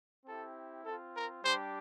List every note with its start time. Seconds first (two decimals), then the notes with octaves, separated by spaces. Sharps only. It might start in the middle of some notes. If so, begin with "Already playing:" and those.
0.25 C4 E4 G4 A4
0.84 C4 F4 A4
1.14 A#4
1.43 G3 D4 G4 C5